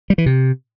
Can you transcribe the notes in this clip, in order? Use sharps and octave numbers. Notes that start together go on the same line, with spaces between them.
G3
E3
C3